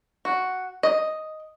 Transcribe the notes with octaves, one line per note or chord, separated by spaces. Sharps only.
F#4
D#5